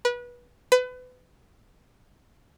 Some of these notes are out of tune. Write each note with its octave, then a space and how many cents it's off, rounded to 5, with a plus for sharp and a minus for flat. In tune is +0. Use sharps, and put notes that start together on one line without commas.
B4 -25
B4 +30